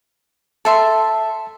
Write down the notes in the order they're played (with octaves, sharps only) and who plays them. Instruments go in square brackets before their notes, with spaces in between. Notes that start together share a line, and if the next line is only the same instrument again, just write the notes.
[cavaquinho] A4 E5 C6 [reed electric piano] A5